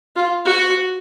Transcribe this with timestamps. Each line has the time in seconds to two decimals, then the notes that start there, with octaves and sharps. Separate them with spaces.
0.16 F4
0.45 F#4